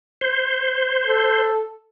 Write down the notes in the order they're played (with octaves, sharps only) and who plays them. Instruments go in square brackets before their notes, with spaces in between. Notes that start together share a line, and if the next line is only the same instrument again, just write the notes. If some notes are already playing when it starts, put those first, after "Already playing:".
[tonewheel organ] C5
[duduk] A4